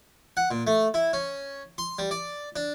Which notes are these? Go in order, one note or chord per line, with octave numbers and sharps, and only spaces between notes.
F#5
A#2
A3
E4
C#4
C6
G3
D5
D4